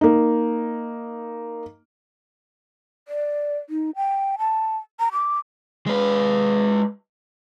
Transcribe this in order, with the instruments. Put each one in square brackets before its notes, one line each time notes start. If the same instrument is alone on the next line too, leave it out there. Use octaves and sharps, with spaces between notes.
[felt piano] A#3 D#4
[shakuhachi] D5
D#4
G5
A5
A#5
D6
[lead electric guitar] G#3 B4